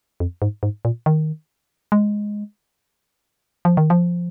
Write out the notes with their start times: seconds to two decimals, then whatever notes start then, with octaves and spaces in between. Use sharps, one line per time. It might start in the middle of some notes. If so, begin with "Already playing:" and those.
0.20 F2
0.42 G#2
0.63 G#2
0.85 A#2
1.06 D#3
1.92 G#3
3.65 F3
3.77 D#3
3.90 F3